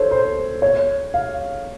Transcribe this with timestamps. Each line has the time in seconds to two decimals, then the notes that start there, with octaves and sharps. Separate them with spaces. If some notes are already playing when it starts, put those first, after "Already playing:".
Already playing: A4 C5 C#5
0.11 C5
0.62 C#5
1.14 F5